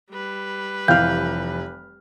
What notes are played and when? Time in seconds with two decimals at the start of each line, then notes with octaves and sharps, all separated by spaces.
0.11 G3 B4
0.88 F1 E3 F5 G5 F6 G6